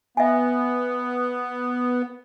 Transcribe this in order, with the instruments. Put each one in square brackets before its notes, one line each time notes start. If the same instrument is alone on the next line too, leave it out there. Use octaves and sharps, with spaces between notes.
[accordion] B3 [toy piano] E5 G#5